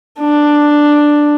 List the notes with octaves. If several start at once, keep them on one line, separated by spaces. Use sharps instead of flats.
D4